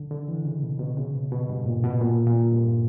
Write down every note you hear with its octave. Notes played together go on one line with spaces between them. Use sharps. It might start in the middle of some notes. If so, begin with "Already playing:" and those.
Already playing: D3
D3
E3
C#3
B2
B2
C#3
B2
B2
G2
A#2
B2
A#2
A#2
G2